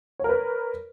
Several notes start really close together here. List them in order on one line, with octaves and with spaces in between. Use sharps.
C#5 A#4 B4